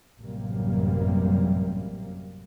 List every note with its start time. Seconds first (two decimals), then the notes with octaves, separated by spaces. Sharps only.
0.22 A1 F#2 C3 G3 A#3